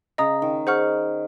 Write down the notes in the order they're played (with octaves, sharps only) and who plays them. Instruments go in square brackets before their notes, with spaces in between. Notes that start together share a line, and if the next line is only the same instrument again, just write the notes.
[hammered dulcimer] C#3 [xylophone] D#5 A#5 D#6
[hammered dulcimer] D#3
[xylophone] G#4 C5 F#5 C#6 F6